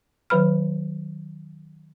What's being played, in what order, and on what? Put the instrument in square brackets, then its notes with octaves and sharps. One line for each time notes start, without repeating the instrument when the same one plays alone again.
[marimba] D#3 F#3 B4 B5 F6